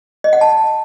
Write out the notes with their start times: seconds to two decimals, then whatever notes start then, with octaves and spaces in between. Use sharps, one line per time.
0.24 D#5
0.33 F#5
0.41 A5